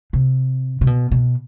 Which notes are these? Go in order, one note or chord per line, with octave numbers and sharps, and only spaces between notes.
C3
C3
B2
B2